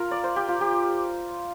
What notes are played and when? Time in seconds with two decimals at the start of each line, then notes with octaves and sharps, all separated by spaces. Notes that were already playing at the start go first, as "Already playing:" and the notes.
Already playing: F4 A#4
0.11 D5
0.24 C5
0.36 G4
0.48 F4
0.61 G4